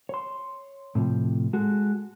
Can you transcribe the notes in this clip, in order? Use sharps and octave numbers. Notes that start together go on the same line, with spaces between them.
C#5 C6
A2 C3 F3
G#3 F#4 A4